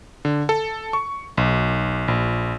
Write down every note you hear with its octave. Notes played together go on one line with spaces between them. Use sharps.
D3
A4
C#6
B1
A#1